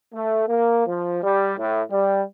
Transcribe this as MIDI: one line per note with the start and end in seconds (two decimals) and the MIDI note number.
0.14 0.45 57
0.48 0.87 58
0.87 1.18 53
1.23 1.53 55
1.58 1.82 45
1.91 2.23 55